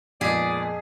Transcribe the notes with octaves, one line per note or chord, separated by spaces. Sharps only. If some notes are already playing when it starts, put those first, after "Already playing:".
F2 A#2 G#3 B3 G#4 D5 B6 D#7